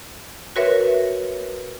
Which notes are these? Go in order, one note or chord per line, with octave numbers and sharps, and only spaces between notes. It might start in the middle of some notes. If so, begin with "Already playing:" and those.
F#4 A#4 B4 C#5 E5